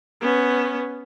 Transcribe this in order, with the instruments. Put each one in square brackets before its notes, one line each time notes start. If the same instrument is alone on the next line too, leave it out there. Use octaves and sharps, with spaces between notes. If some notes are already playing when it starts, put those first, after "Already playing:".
[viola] B3 C#4